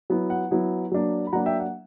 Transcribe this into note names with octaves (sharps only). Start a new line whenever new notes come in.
F#3 B3 E4
F#5
F#3 B3 E4
F#3 A#3 D4
B5
F#3 A#3 D4 F#5 A#5
E5 G5
F#5